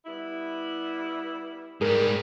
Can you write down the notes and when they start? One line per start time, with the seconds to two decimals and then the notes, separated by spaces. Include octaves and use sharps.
0.05 G3 B3 E4
1.81 G#2 G3 G#4 A#4